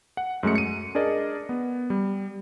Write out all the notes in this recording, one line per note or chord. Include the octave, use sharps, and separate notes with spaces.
F#5
F#2 G#3 A3 C#7
C#7 D#7
D4 G#4 A#4 D5 D#5
B3
G3